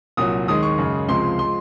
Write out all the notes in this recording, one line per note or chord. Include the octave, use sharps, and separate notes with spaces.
C2 A#2 F#3 D#6
D#2 D#3 G#3 D#6
C#6
F#2 C#3 G#3
C#2 C3 F3 G#3 C6
F3 G#3 C6